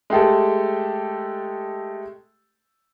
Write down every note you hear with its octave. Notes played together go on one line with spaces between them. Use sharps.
G#3 A3 G4 A4